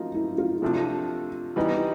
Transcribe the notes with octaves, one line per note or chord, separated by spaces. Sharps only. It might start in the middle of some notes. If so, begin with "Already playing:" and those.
Already playing: F3 A#3 D#4 F4 F#4
E4
F4
C3 F3 A3 D4 F4
E3 G3 B3 D#4 E4